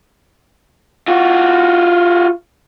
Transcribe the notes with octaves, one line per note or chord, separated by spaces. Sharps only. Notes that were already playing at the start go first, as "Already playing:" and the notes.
F4 F#4